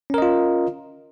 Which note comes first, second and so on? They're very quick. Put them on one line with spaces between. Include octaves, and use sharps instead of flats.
C#4 A#4 D#5 F4